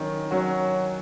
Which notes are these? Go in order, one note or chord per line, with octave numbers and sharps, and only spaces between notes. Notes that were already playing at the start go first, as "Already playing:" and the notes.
Already playing: D#3 F#3 C#4
F#3 C#4 F#4